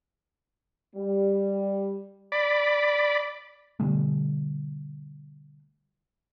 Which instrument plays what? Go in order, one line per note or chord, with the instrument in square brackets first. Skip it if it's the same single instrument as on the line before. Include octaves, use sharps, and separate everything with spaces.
[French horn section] G3
[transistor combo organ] D5 B5
[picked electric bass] B2 D3 G3 A3